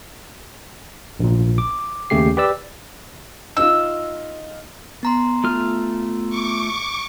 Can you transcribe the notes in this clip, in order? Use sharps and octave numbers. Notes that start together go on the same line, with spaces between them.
A#1 A#2
D6
D#2 C#3 A3 G4 C7
G4 B4 D5 E6
D#4 F4 E6
B3 A#5 C6
A3 F4 F6
C#6 D6